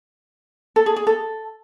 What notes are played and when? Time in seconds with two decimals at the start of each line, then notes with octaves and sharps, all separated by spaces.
0.76 A4
0.86 G#4
0.96 G#4
1.07 A4